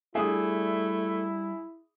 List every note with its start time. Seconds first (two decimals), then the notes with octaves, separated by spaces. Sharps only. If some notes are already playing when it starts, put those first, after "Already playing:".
0.15 G3 A3 D4 E4 G#4 E5 D#6